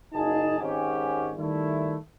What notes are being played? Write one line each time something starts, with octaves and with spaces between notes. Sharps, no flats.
F#1 D#4 G#4 A5
G#1 G#2 C#4 G4
D#3 G3 A3 E4